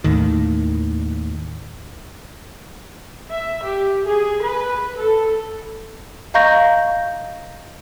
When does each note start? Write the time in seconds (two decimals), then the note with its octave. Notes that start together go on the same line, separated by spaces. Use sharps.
0.04 D#2 A2 D#3
3.30 E5
3.64 G4
4.07 G#4
4.43 B4
4.97 A4
6.34 D#5 F5 A#5 C#6 G6 A#6